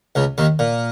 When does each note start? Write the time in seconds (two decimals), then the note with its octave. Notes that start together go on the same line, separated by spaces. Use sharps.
0.15 C#2 C#3
0.38 D#2 D#3
0.59 A#2